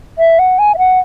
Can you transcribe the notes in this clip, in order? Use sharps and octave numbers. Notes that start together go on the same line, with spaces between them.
E5
F#5
G#5
E5
F#5